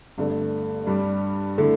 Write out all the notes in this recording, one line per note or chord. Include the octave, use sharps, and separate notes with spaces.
G1 G2 D3 A3
G2 G3 D4
D3 A3 E4